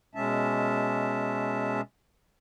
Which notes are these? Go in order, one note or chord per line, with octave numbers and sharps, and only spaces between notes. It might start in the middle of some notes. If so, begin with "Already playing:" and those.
B2 G#3 C#4 E5 A5